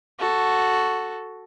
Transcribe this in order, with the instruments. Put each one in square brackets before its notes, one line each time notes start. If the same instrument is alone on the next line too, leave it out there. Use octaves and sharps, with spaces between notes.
[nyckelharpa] F#4 A4